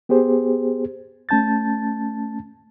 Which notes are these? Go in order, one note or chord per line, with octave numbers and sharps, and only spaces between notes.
B3 G4 G#4 C5
A3 C#4 A5 G6 A6